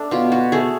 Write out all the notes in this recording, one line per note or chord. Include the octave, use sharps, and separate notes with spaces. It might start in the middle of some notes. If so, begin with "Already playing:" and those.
Already playing: A3 D4
B2 F4
F#4
A3 G#4